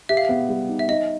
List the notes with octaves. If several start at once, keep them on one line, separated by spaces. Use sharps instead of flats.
G4 E5
F5
B3 E5
G3
D#4
E5
D#4 D#5